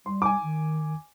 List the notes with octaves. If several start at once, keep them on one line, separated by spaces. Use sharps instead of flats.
G3 C6
G#5 D6
D#3